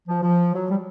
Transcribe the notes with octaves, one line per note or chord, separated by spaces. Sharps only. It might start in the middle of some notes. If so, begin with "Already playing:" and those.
F3
F3
F#3
G3